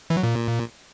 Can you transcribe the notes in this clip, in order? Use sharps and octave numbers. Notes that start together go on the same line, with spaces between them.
E3
F#3
A#2